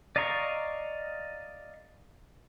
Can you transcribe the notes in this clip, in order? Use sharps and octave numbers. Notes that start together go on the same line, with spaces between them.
D5 D#5 F5 A#5 C#6